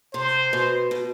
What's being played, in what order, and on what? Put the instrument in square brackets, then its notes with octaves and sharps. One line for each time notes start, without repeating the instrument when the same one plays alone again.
[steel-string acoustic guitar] C3 [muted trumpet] C5
[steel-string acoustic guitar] B2
B2